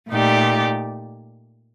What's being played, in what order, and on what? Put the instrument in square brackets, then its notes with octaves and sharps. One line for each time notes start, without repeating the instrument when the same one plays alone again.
[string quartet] A#2 A3 D#4 G4 D5